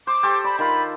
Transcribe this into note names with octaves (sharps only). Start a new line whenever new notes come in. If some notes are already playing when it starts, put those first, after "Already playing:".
C5 D6
G4 A4 C5
D5 B5
D#3 F4 B5